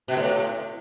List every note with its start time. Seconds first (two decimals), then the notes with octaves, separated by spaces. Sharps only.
0.08 B2
0.17 A2